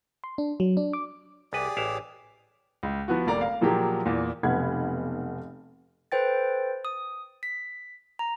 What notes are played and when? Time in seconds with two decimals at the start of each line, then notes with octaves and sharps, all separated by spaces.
0.24 C6
0.38 D4
0.60 F#3
0.77 D4
0.93 D6
1.53 C2 G4 G#4 B4 D5
1.77 A1 E4 F5
2.83 C#2
3.08 F3 B3 F#4
3.27 F1 A#3 D5 A#5
3.41 F5
3.61 A#2 F3 F#3 A#3 G4 G#4
4.05 E2 A#2
4.43 F1 B1 B3 F#5 B5 G#6
6.12 A4 B4 C5 G5 A6
6.85 D#6
7.43 B6
8.19 A#5